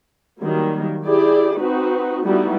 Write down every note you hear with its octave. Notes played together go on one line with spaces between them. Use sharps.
D#3 F#3 G3 A#3
E4 G4 G#4 D5
C4 D#4 F#4 B4
G3 A3 B3 D#4 E4 F#4